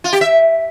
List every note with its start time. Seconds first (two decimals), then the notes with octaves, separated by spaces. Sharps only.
0.04 F4
0.13 G4
0.21 E5